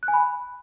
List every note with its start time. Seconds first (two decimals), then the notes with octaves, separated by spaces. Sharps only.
0.03 F#6
0.08 G#5
0.14 B5